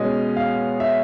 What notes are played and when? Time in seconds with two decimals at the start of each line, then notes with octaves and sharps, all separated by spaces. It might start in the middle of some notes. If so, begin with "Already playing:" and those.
Already playing: B2 G#3 C#4 D#5
0.37 F5
0.80 E5